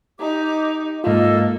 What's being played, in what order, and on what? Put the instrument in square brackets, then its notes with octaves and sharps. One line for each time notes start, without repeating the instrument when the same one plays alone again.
[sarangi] D#4 [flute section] G4 A#5 D6
[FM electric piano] G#2 F4 [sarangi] A#3 [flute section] A4 D#5